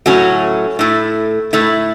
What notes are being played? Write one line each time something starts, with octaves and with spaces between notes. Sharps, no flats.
A2 F#3 A3 C#4 F#4
A2 A3 E4
A2 A3 E4